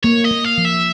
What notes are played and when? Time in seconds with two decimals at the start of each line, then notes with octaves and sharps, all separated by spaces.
0.04 A#3 C#5
0.24 D#5
0.31 A#3
0.44 F5
0.58 F3
0.65 E5